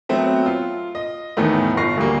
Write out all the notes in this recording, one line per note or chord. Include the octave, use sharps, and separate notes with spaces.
F#3 A3 B3 C4 F#4 E5
F4
D#5
E2 A2 D#3 A3 B3
G1 F4 C#6 A#6 C7
D2 G3 A#3